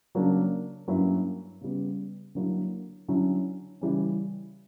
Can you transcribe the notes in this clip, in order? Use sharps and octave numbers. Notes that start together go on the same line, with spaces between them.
C#3 F#3 A#3 D4
G2 F#3 A#3 C#4 E4
C#3 G3 B3
D3 F#3 A#3 E4
D3 F#3 C#4 E4
C#3 E3 G3 C#4